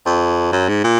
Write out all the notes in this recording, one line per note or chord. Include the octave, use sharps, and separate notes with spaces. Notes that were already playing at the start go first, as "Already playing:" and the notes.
F2
F#2
G#2
A#2